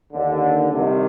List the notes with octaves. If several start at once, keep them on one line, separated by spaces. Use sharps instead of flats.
D#2 D3
C2 C3 D#3